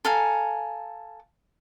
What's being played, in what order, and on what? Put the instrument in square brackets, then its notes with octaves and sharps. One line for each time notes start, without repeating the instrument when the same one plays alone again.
[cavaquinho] A4 F5 G#5 A#5